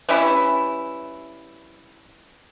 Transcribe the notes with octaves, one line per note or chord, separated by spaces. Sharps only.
E3 G3 C#4 E4